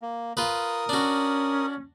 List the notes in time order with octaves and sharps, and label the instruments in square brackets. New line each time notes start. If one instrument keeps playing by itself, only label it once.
[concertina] A#3
[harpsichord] F4 B4 [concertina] A#4 D#6
[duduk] C#4 [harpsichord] D4 F#4